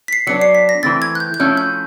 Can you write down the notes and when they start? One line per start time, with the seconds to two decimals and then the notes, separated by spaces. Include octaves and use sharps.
0.08 B6
0.13 C7
0.27 F#3 B3 D4 C#7
0.41 C7
0.55 B6
0.69 A#6
0.83 E3 A3 C4 A6
1.02 G#6
1.15 F#6
1.20 G6
1.34 G6
1.40 F3 A3 C#4 E4 A4 F#6
1.57 G6